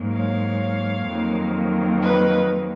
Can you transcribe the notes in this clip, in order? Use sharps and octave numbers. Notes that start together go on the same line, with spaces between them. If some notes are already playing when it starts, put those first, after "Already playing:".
Already playing: G#2 F#3 A#3
C#5 F5
F2 D#3 F#3 A#3
B4 D#5